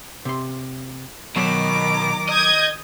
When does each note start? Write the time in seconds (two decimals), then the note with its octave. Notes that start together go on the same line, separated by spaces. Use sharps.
0.25 C3 C6
1.36 B2 D#3 F#3 A#5 D6
2.29 D#5 D#6 G6 G#6